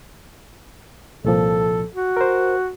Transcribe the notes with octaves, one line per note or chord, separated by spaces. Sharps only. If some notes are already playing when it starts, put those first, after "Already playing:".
C2 A#2 F3 A4
F#4
A#4 C5